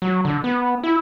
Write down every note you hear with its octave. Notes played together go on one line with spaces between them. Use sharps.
F#3
D3
B3
E4